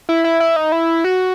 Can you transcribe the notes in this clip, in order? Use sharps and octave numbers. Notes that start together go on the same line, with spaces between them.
E4
E4
E4
D#4
E4
F#4